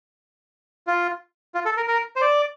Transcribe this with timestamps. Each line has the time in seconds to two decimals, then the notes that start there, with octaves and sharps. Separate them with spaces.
0.87 F4
1.55 F4
1.65 A4
1.77 A#4
1.88 A#4
2.16 C5
2.21 D5